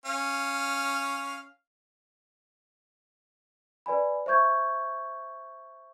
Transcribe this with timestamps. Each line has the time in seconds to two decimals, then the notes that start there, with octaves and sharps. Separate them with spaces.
0.06 C#4 F5
3.86 B4 D5 G#5 B5
4.26 C5 E5 C#6 G6 G#6